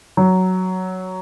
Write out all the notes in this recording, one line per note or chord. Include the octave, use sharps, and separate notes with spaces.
F#3